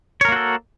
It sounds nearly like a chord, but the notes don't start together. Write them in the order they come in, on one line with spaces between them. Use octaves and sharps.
C#5 A#4 A#3 F#4 A4